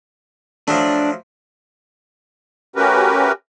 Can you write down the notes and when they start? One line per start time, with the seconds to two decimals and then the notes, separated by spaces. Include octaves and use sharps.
0.68 F3 F#3 A3 D4
2.76 A3 C#4 F#4 G4 A#4 B4